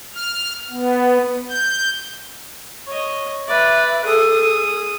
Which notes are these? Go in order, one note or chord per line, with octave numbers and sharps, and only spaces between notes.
F6
B3
G6
C#5 D#5
B4 D5 E5
G#4 A4 D#6